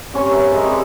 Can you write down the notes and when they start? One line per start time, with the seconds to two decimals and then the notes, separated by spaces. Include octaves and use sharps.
0.14 G2 C4 C#4 C#6
0.31 A#4 B4 E5
0.52 G#3 B4 D#5
0.64 G3 C4